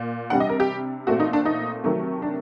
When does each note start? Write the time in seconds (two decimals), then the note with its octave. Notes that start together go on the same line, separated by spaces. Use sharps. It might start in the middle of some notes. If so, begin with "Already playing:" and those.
Already playing: A#2
0.30 C3 G3 D4 F#5
0.40 D#5
0.49 A#4
0.60 G4
1.07 A#2 A3 C4 F#4
1.20 D#4
1.33 D4
1.45 D#4
1.84 C3 D#3 F#3 A3
2.22 D4